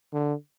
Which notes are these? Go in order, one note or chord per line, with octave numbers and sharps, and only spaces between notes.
D3